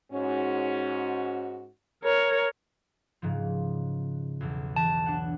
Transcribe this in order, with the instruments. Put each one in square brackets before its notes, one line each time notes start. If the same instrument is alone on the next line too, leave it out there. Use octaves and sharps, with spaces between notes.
[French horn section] G#2 C#4 F#4
[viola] A#4 C#5
[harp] G#2 C#3 F3
B1 E2
[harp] E3 [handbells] A5
[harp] D4 F#5